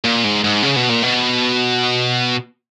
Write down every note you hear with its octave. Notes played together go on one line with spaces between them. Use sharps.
A#2
G#2
G#2
C#3
B2
A#2
B2